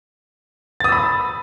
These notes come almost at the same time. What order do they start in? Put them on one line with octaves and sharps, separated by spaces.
A6 D#6 E6 B5